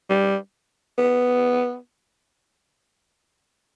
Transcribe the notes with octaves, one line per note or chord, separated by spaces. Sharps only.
G3
B3